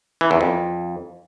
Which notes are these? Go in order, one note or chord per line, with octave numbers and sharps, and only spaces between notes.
E3
E2
F2